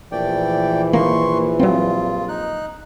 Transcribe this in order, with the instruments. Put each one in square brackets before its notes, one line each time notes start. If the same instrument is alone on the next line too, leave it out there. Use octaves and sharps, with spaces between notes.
[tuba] A#1 [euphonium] E3 [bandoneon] A3 D5 G5
[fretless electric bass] D#3 A#3 [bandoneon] C6 C#6
[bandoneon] G2 F4 [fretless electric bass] F#3 C4
[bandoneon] D#4 F#6